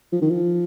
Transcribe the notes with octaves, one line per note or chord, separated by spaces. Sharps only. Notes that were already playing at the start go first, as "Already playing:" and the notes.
F3
D#3
F3